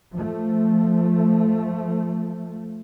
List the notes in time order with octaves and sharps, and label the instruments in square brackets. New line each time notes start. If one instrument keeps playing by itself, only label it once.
[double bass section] F3 A3